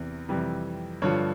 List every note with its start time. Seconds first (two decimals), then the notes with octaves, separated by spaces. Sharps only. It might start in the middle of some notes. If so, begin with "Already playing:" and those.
Already playing: E2 C3 E3
0.29 F2 C3 E3 G3
1.02 G2 D3 F3 C#5